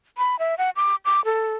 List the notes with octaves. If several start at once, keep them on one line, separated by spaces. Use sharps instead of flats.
B5
E5
F#5
D6
D6
A4